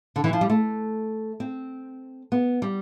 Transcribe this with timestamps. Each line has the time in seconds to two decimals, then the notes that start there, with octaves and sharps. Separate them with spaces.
0.16 D3
0.24 E3
0.33 F3
0.41 G3
0.50 A3
1.40 C4
2.32 B3
2.62 G3